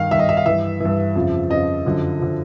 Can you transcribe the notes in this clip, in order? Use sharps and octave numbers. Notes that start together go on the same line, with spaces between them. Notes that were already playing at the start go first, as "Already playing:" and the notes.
Already playing: G2 D#3 F5
G2 D#3 E5
D#5
E5
F5
G2 E3 E5
G2 E3
F2 C#3 F3
F2 C#3 F3 D#5
F#2 D3 F3
D3 F3